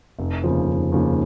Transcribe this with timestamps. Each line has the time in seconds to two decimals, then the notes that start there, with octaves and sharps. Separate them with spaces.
0.19 F1
0.44 D#2 C#3 F3
0.68 F1
0.92 D#2 C#3 F3